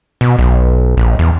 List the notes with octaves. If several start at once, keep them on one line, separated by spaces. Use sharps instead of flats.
B2
B1
A#1
E2